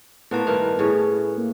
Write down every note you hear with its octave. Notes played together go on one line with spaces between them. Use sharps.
A2 A#3 B3 B4 A5
G2 D#3 E4 A#4 B4
A2 C#4 G#4 C#5
A#3